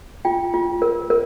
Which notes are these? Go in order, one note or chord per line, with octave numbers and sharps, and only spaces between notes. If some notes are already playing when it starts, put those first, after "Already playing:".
F4 G5
F4
A#4
A#4